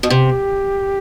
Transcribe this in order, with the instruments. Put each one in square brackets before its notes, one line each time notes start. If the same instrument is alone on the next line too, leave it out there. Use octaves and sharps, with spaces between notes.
[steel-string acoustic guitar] B2 [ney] F#4
[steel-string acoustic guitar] C3 [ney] G4